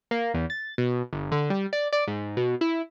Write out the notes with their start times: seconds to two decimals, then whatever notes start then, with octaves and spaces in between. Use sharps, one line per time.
0.11 A#3
0.34 E2
0.50 A6
0.78 B2
1.13 G1
1.32 D3
1.50 G3
1.73 D5
1.93 D5
2.07 G#2
2.37 B2
2.61 E4